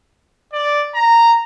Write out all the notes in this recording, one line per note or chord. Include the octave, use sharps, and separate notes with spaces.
D5
A#5